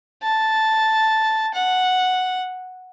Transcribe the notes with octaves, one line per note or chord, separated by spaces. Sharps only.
A5
F#5